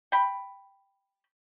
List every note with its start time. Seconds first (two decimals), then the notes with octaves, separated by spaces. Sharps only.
0.12 G5 B5